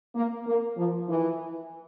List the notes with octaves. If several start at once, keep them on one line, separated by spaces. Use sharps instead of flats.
A#3
A#3
F3
E3